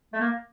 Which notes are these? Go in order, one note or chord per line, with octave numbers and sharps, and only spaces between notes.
A3
A#3